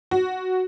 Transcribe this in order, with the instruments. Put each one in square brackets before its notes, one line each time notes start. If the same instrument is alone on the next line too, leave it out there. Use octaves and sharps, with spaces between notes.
[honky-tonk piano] F#4